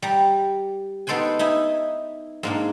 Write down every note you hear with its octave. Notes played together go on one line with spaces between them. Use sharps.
G3 A#5
B3 D#4 A4 C5 G5 G#5
D#4 E4 E5 G#5
G#2 A#3 D4